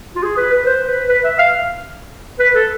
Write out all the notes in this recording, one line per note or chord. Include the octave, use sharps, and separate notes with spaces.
F4
G#4
B4
B4
C5
B4
B4
E5
F5
B4
A4